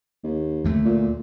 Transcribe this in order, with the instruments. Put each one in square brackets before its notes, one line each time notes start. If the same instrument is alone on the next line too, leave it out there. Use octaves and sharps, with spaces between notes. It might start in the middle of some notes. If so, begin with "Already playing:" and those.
[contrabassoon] D#2
[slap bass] D2 A3
[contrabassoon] A#2